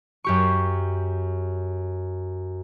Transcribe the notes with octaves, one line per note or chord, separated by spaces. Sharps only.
F#2 G4 C#6